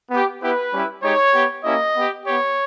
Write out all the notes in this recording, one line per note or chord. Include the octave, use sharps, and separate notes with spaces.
B3 G4
B3 E4 G4 B4
G3 C#4 E4 G4
G#3 D#4 G4 C#5
B3 G4
A#3 C#4 E4 G4 D#5
B3 G4
B3 G4 C#5